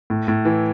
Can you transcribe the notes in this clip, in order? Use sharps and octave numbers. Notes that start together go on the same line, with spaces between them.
A2
A2
E3